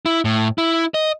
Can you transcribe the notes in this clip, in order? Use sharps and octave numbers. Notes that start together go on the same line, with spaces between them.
E4
A2
E4
D#5